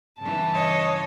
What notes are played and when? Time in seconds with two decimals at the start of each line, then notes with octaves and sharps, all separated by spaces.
0.20 G2 C#3 E3 A5
0.54 C#5 D#5